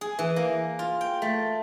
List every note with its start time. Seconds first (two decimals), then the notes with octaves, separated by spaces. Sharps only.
0.01 G#4
0.19 E3
0.36 A#3
0.79 F4
1.01 G5
1.22 A3